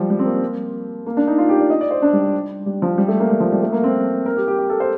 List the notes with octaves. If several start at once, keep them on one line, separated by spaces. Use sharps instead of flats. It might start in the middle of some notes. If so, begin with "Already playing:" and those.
Already playing: F3 G3
G3
C4
A#3
A#3
D4
D#4
F4
G4
D5
D#5
D5
C5
D4
G3
G3
F3
G3
A3
A#3
G3
F3
G3
A3
A#3
C4
A#4
G4
G4
G4
A4
C5